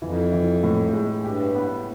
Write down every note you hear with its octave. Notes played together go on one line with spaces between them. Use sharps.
F2 E3
E3
A2
G#3
G2 G4
B3